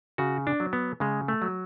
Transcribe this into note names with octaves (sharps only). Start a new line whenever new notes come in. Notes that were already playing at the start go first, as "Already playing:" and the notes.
C#3 F#4
D4
F#3
B3
C#3 G#3
A3
F#3